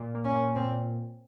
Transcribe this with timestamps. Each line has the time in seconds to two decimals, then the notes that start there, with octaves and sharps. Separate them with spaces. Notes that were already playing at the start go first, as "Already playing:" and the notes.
Already playing: A#2
0.14 A#3
0.25 C#4
0.35 A#2
0.55 A#2 C4